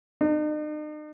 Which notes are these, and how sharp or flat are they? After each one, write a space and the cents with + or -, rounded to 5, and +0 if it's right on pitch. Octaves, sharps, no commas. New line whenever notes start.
D#4 -45